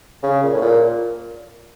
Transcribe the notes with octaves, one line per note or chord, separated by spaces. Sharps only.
C#3
A#2
A2
A#2